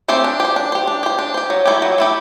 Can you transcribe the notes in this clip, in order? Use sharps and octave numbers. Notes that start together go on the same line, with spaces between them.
A3 C4 G4 C5
D4
G4 C5
D4
G4 C5
D4
G4 C5
D4
G4 C5
F#3
A3 E4 G4
F#3
A3 E4 G4